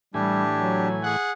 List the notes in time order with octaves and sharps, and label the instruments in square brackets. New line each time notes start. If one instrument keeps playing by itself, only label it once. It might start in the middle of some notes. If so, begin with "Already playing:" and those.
[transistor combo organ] A2 E3 G#5 [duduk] G3 [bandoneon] D4 G4
[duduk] F#3
[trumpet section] G#4 F#5